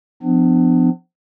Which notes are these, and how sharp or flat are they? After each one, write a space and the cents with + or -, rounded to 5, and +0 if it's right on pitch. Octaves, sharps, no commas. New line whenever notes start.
F3 +0 B3 +40 D4 +30